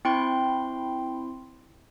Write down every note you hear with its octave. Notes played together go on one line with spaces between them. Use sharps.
C4 E4 G5 C6